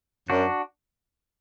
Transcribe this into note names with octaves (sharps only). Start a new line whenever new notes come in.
F#2 D4 F#4